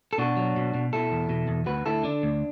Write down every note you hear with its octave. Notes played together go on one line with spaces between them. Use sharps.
A4
B2 D4 F#4
F#3
B2
B2
B2 E4 A4
E2
B2
E2
D2 F#4 B4
D2 E4 A4
D3 D4
D2